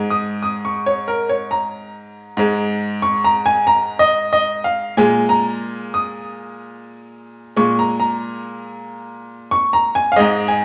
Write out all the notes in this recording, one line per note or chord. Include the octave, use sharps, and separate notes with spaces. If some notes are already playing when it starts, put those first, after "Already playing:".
Already playing: G#2 G#3
D#6
D#6
C#6
C#5
A#4
C#5
A#5
G#2 G#3
C#6
A#5
G#5
A#5
D#5
D#5
F5
A#2 G#3 G#5
A#5
D#6
A#2 G#3 C#6
A#5
A#5
C#6
A#5
G#5
F5
G#2 G#3 D#5
G#5